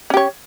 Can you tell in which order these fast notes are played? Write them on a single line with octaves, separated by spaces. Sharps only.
C#4 G4 C#5